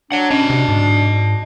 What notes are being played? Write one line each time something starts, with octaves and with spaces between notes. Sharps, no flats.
D4 C#5 F#5
C#4 D#5 A5
C3
G#2